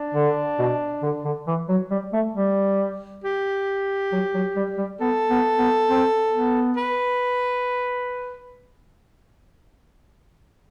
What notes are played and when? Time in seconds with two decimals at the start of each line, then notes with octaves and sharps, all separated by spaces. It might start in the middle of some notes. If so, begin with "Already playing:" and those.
Already playing: D4
0.15 D3
0.59 B2
1.03 D3
1.25 D3
1.47 E3
1.69 F#3
1.91 G3
2.13 A3
2.36 G3
3.24 G4
4.12 F#3
4.35 F#3
4.56 G3
4.78 G3
5.00 B3 A4
5.30 B3
5.59 B3
5.89 C4
6.33 B3
6.77 B4